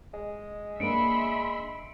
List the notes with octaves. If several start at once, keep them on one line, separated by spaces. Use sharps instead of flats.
G#3
A#3 D4 E5 B5 C6 C#7 D7